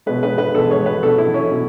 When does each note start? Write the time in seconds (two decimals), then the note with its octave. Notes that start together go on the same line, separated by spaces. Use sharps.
0.06 B2 G#3 B4
0.23 B4
0.38 B4
0.54 B2 G#3 A4
0.71 C#5
0.86 B4
1.02 B2 F#3 A4
1.18 E4
1.34 C#4
1.50 B2 F#3